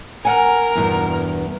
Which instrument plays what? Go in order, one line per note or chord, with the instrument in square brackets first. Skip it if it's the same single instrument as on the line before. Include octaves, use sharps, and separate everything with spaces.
[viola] A#4 [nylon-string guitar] F#5 G#5
[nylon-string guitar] E2 G2 B2